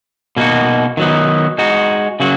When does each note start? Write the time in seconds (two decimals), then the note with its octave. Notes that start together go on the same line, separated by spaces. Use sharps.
0.37 B2 A#3 D#4 F#4
0.97 D#3 F#3 B3 D#4
1.58 G#3 D#4 F#4
2.20 C#3 F#3 A#3 F#4